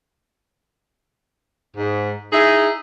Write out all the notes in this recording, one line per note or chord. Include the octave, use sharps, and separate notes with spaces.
G#2
D#4 E4 G#4